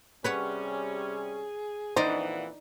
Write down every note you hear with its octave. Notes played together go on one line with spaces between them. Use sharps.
C3 G3 C#4 G#4 B4 C#5 F#5
F2 A#2 E3 D#4 C5 D5 D#5 F#5